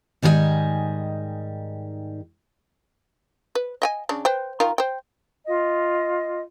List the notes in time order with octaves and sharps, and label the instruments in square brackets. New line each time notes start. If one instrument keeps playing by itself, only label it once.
[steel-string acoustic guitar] G#2 D#3 G3 B4 D#5 G#5
[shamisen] B4
D#5 G5 G#5
C#3 D4
B4 C5 G5
D#3 F4 A#4
C5 G5
[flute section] F4 D#5